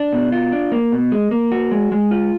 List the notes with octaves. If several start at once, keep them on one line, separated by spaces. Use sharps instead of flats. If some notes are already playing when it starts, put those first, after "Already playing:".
Already playing: D4
B2
F4
D4
A#3
B2
G#3
A#3
F#4
G#3
G#3
F4